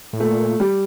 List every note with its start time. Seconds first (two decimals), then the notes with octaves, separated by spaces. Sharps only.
0.13 A2
0.20 A#2 A3
0.60 G3